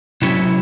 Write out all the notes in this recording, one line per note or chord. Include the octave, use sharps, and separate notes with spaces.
C3 F#3 C#4 E4